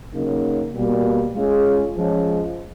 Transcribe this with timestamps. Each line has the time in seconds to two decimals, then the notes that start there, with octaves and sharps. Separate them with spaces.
0.14 C#3 F#3 A#3 D#4
0.74 B2 G3 A#3
1.35 G#3 C#4 F4 G#4
1.95 F3 G#3 C#4